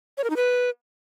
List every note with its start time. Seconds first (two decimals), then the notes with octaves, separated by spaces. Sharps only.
0.18 C#5
0.24 A#4
0.30 D#4
0.36 B4